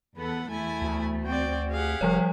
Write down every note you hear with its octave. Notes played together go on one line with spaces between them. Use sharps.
E2 B3 A4 B4 F#5
E2 A3 E4 G#5
D2
C4 F#4 D5 G5
G4 G#4 F5 F#5
F1 F3 G3 C#5